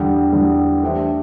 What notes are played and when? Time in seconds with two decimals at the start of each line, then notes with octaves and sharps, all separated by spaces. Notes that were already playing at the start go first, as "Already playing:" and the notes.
Already playing: E2 D3 G3
0.33 E2 D3 G3
0.82 A3 D4 G4 C5 E5